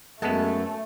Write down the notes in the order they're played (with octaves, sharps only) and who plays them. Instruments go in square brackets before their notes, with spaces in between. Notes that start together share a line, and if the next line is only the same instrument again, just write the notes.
[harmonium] F#2 [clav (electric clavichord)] G#3 B3 [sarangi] A3 [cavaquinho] A4 A5